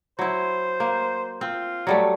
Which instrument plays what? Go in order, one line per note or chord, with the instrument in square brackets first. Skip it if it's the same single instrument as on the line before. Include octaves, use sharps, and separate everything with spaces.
[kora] F#3 E4 [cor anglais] C5
[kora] A#3
[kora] C4 [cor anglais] F4
[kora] F#3 G3 A3